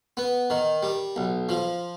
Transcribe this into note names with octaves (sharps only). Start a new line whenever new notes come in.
B3
D#3
G3
B1
F3